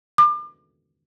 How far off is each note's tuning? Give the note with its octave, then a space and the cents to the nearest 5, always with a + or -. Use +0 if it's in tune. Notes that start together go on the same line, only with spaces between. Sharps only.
D6 +35